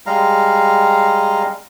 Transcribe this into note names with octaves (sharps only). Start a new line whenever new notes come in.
G3 G#3 F5 A#5